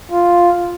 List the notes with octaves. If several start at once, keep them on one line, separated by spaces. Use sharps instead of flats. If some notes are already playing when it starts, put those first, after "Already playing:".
F4